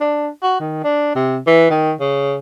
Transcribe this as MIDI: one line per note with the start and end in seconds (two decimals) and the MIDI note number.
0.01 0.28 62
0.42 0.56 66
0.60 0.82 51
0.84 1.14 62
1.15 1.38 48
1.47 1.69 52
1.70 1.93 51
2.00 2.36 49